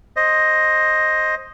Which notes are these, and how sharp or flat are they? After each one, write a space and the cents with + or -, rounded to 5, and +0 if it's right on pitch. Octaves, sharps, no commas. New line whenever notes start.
C5 +15 D#5 +5